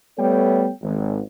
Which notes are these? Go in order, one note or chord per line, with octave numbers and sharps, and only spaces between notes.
G3 A3 B3 A4 C#5 G5
G#1